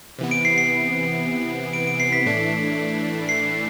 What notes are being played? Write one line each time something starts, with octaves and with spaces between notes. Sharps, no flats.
C3 E3 B3
D7
C7
C7
D7
D7
C7
B6
A2 E3 A3 D4
C7